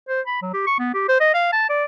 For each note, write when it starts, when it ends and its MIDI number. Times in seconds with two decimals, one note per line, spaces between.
0.09 0.21 72
0.27 0.42 83
0.42 0.51 54
0.54 0.64 67
0.67 0.76 85
0.79 0.92 59
0.94 1.08 67
1.09 1.19 72
1.21 1.34 75
1.34 1.50 77
1.53 1.70 81
1.70 1.85 74